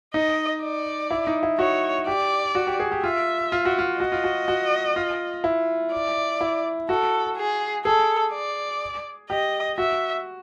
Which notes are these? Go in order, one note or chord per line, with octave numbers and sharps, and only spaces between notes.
D#4 D#5
D5
E4
D#4
E4
F#4 C#5
G4 D5
F#4
G4
G#4
G4
F4 E5
F4
F#4
F4
F#4 D#5
F4
F#4
F#4
F4
E4
D5
E4
F#4 A4
G#4
G#4 A4
D5
G4 D#5
F#4 E5